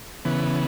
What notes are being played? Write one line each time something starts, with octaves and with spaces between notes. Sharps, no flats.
C#3 E3 B3